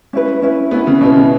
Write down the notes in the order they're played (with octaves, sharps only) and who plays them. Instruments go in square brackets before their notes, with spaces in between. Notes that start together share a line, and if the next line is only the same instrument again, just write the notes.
[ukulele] C#4 E4 B4
C#4 E4 B4
[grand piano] B3 [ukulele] C#4 E4 B4
[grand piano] C#3
[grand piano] B2 [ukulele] C#4 E4 B4
[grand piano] C#3